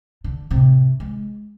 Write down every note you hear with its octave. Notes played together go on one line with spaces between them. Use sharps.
D3
A2 C3
G#3